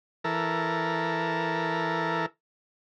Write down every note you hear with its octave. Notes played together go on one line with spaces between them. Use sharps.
E3 A4 A#4